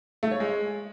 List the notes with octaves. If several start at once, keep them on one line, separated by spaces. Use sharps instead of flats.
A3
C#5
G#3